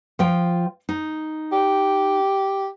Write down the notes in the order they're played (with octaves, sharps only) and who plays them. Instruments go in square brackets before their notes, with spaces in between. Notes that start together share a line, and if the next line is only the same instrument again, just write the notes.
[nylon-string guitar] F3 F4 G5
D#4
[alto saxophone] G4